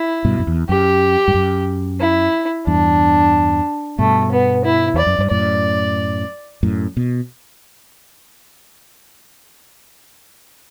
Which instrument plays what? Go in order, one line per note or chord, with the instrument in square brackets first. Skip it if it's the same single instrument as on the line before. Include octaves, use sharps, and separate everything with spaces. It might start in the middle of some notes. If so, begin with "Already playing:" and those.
Already playing: [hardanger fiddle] E4
[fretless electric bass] G2 B2
F#2
E2
[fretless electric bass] F#2 [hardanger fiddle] G4
[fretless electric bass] G2
F#2
[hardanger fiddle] E4
[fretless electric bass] E2 G2 [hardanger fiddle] D4
[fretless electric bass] G2 B2 [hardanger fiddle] A3
[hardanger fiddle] B3
E4
[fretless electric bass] E2 [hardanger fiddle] D5
[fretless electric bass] F#2
G2
[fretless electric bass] F#2 A2 [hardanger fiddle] D5
[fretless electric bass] F#2 A2
B2